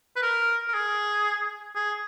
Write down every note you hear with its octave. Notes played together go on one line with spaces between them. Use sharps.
B4
A#4
A#4
G#4
G#4